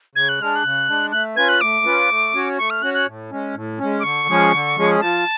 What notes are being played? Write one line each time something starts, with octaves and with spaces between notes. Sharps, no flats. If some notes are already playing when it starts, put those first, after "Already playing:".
C#3 G#6
F#6
G#3 D4 F6
F#6
C#3
G#3 D4
A3 F#6
C#4 F4 B4 G#6
F#6
A3 D6
C#4 F4 B4
A3
C#4 F#4 C#5
A3 C#6
F6
C#4 F#4 C#5 F#6
F#6
A2
G#3 C#4
A2
G#3 C#4
D6
D3 C#6
F3 G#3 C#4 G#4
D3
F3 G#3 C#4 G#4
F3 A5